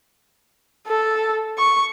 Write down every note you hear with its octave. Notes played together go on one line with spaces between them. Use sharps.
A4
C#6